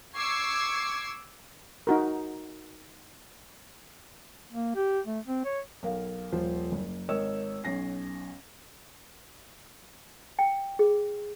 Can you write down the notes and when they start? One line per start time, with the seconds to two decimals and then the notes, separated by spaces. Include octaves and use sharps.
0.15 C#6 D6 E6 G#6 C7
1.87 D#4 F#4 A#4
4.52 A#3
4.75 G4
5.06 A3
5.27 C4
5.45 C#5
5.83 B1 A#4 F5
6.32 D#1 F3 F4 C5
6.72 F#1
7.09 G#1 A#4 C#5 D#5 E6 E7
7.64 B1 C#4 A#6 C7
10.39 G5
10.79 G#4